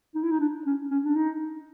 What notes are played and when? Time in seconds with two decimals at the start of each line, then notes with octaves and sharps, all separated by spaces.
0.15 D#4
0.23 E4
0.31 D#4
0.40 D4
0.66 C#4
0.91 C#4
1.04 D4
1.16 D#4